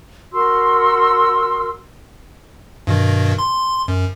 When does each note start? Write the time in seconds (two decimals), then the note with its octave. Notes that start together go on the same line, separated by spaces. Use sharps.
0.33 F#4 A#4 C6 E6
2.87 G2 B2 D#3
3.38 C6
3.88 F#2